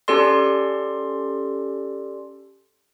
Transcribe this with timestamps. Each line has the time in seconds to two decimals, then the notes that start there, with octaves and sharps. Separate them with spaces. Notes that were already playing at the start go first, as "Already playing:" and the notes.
0.08 C#4 G4 A4 D5 C6